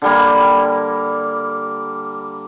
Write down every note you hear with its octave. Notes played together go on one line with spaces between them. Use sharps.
D3 G3 A#3